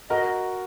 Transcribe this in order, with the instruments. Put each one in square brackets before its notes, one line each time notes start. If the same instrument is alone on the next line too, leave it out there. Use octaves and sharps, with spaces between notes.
[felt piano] F#4 A#4 [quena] D#5